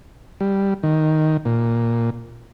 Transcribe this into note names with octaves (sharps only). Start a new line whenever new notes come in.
G3
D#3
A#2